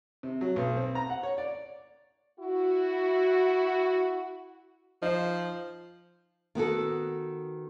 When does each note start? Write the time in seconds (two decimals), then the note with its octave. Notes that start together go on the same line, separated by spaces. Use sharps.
0.23 C3
0.41 F#3
0.56 B1
0.76 C4
0.95 A#5
1.10 F#5
1.23 C#5
1.38 D5
2.39 E4 F#4
5.02 F3 D#4 C5
6.55 D#3 B3 F#4 A4